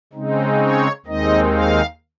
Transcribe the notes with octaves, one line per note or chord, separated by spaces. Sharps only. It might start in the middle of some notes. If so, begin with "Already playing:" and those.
C#3 G#3 C4 D#4
C#5
D#2 D#3 G#3 C4 D#4 D#5
F5